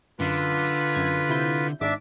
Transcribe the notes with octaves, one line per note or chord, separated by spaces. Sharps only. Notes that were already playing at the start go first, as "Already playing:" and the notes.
F#2 D3 F4 B4
F#2 G#6
C3 E4 G6
G#1 G#2 D4 E5 D6